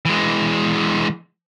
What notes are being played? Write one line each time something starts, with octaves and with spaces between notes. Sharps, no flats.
E3 G#3